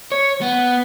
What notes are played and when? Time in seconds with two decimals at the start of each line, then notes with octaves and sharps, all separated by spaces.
0.12 C#5
0.41 B3